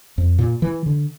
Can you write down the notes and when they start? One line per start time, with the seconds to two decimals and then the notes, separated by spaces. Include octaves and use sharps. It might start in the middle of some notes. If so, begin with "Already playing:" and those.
0.18 F2
0.38 A#2
0.62 E3
0.86 D3